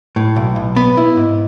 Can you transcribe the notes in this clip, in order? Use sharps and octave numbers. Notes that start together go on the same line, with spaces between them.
A2
B1
B1
B3
E4
G#2